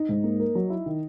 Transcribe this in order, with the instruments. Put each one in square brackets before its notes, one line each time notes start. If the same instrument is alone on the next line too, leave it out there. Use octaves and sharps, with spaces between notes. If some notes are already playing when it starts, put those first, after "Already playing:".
Already playing: [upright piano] D#4
[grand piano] G#2
A#3
A#4
F#3
E4
D#3